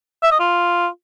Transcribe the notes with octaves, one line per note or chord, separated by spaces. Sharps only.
E5
D#5
F4